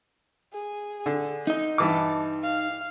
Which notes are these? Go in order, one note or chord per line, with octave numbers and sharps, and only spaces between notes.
G#4
D3
D#4 D#5
G2 E3 A5 D6
F5